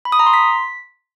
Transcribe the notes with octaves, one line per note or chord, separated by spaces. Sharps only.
B5
D#6
A#5
C6
B6